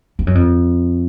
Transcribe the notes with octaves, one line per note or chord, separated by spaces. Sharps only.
G2
F#2
F2